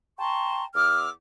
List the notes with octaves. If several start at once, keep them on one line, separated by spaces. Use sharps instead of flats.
G5 A5 A#5 C6 C#6
E2 D6 E6 F6